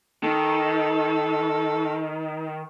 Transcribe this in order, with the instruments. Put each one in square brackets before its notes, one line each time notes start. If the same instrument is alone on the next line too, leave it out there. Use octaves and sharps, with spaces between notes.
[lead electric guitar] D#3 [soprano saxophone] A4